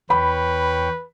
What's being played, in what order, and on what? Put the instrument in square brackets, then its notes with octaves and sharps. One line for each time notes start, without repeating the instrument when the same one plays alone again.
[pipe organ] E2 C#5 G5 [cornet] B4 [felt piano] B5